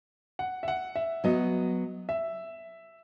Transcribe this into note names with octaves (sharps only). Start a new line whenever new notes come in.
F#5
E5
F#5
E5
F#3 B3 F#4 D#5
E5